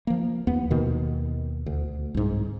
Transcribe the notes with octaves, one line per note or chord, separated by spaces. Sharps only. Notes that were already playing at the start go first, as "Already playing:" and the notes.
F3 A#3
D#2 B3
D#2 B2 D#3
D2
C2 G#2